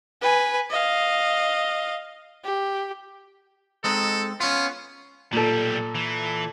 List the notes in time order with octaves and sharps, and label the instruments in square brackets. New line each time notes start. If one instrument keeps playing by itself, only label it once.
[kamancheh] B4 G#5
D#5 F5
G4
[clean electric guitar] G#3 C4 D#4 [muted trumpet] A4
[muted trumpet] B3 [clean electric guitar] C#4 F4
[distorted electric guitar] B1 G3 [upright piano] A#2 A4
[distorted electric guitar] E3